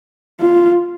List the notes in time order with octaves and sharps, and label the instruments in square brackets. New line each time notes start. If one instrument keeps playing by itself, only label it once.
[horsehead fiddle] F4